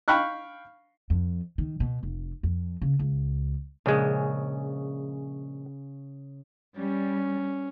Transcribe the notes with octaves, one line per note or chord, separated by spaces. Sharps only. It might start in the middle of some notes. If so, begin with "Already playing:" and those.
F5 G5 B5 C#6 F6 F#6
F2
D#3
B2
F1
F2
C#3
C#2
A#1 C#3 G#3
G3 C#4